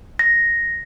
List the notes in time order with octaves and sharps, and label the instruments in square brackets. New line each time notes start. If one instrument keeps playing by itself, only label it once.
[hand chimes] A#6